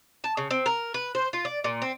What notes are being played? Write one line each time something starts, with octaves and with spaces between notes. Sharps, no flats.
A5
C#3
C4
A#4
B4
C5
F4
D5
A#2
C4